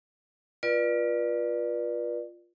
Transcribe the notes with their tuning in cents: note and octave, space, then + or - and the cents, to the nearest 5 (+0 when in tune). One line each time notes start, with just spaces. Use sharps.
F4 +0 B4 -35 D5 +20